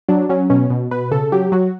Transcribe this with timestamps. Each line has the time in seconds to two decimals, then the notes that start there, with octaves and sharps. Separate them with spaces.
0.09 F#3 D4
0.29 F#3 C#4
0.50 B2 C#4
0.70 B2
0.91 B2 B4
1.11 C#3 A4
1.32 F#3 G4
1.52 F#3 F#4